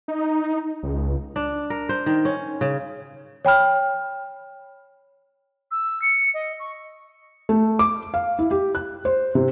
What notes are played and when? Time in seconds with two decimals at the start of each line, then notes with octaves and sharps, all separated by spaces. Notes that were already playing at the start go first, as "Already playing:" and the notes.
0.08 D#4
0.83 C#2
1.36 D4
1.70 A#4
1.89 C5
2.06 D#3
2.25 C#4
2.61 C#3
3.45 C#5 G5 B5 F6
5.71 E6
6.02 C#7
6.34 D#5
6.60 C#6
7.49 A3
7.79 D6
8.14 F5
8.39 E4
8.51 G4
8.75 F#6
9.05 C5
9.35 C3